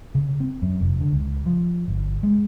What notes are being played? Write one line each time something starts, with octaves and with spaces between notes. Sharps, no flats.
C#3
C4
F#2
F1
D3
C#2
F3
G1
G#3